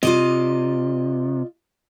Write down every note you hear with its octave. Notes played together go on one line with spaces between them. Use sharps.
C3 F4 D5 D#5